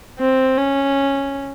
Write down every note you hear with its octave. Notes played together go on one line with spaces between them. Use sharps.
C4
C#4